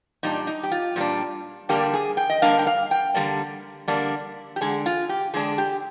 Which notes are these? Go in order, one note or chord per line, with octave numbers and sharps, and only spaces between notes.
A#2 G3 D4 D#4
D#4
G4
F4
A#2 G3 D4
D3 G3 A#3 D4 G4
G#4
G5
D#5
D3 G3 A#3 D4 F5
G5
F5
G5
D3 G3 A#3 D4
D3 G3 A#3 D4
G4
D3 G#3 D4 G#4
F4
G4
D3 G#3 D4 G#4
G4